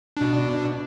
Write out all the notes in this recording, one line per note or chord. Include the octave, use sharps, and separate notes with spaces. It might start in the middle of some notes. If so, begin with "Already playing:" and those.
B2 D4